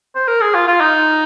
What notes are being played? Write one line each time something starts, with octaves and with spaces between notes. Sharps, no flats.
C5
A#4
G#4
F4
F4
D#4